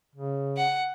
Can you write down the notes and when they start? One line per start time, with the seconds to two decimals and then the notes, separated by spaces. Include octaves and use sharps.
0.16 C#3
0.57 F#5